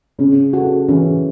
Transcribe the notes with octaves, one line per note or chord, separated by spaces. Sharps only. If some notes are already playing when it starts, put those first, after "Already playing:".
C#3 C#4
F#4 A4
E3 C#4